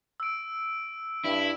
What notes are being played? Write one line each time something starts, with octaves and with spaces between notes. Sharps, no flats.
E6 D7
G2 E4